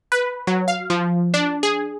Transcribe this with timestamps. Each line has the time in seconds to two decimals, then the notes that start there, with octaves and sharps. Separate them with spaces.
0.12 B4
0.47 F#3
0.68 F5
0.90 F3
1.34 D4
1.63 G#4